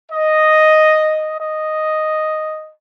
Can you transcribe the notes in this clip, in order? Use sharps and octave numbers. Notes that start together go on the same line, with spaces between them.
D#5
D#5